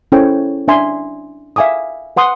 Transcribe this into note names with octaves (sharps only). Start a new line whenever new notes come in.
C#4 E4 A4 C5 C#5 G5
D4 E5 G#5 C6
E5 F5 G#5 D6 D#6
B4 F#5 C6 D#6